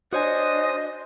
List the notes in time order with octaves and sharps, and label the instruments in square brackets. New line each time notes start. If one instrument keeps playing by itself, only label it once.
[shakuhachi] D4 [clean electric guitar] F#4 C#5 G#5 [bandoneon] C5 D#6 [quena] D#5